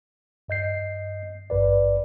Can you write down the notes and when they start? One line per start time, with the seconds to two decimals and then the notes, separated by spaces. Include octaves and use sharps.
0.48 G2 D#5 G6 C7
1.50 G#1 G2 B4 D5